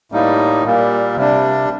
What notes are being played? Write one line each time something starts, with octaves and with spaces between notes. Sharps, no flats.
A2 G3 A#3 D#4
A#2 G3 A#3
C3 G3 D4